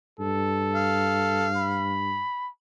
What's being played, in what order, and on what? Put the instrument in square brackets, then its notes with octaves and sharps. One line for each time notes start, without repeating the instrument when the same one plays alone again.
[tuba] G2 [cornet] A4
[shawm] F5
[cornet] B5